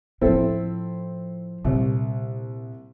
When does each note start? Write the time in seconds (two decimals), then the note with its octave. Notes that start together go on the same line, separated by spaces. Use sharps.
0.21 A2 F3 C4 E4 A4
1.65 C2 A#2